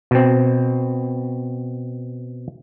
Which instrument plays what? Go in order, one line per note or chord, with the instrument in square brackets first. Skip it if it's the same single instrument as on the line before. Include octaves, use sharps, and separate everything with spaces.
[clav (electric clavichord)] B2 C4